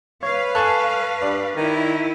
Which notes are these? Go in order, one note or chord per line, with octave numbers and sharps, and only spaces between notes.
B4 C#5 F5
A4 G#5 A5 C#6 F#6
G2 D5
D#3 E4